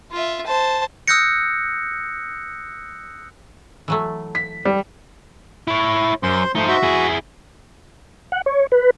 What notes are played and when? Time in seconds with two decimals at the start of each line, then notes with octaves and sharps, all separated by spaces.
0.12 F4 E5
0.46 C5 A5
1.08 D#6 E6 F#6 G6 A#6 C#7
3.88 E3 F#3 A3
4.35 B6
4.65 G3
5.68 E4 C#5
6.23 F#2 C5 C6
6.55 F3 A3 D#4 C5
6.68 F#4 E5
6.83 E4 G#4
8.32 F#5
8.46 C#5
8.72 B4